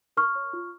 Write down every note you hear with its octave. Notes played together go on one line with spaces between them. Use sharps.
A#4 C#6 F6
C#5
F4